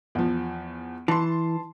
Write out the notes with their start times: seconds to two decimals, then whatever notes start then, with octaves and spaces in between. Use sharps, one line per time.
0.15 E2 F3
1.08 E3 A5 C6